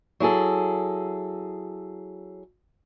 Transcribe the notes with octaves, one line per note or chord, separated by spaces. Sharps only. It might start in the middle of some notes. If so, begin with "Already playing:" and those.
F#3 E4 G#4 A4